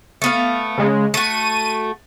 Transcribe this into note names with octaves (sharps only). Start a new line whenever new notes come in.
A3 B3 F5
C#3 G#3
A3 F#4 D#7